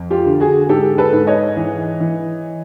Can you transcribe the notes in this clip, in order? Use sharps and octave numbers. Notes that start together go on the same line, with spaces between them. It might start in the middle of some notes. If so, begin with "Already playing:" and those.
Already playing: F2
F4 G4
D3
F#4 G#4
G#2 G4 A4
A4 B4
G#2
C#5 D#5
E3
E3